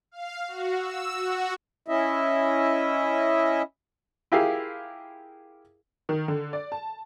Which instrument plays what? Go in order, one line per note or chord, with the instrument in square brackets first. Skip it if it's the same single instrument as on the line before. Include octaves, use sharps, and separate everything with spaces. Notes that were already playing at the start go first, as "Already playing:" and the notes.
[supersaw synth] F5
F#4
E6
F#4
[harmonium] C#4 E4 D#5 E5
[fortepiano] E4 F4 G4 G#4 A#4 F5
[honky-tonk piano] D#3
D3
D5
A5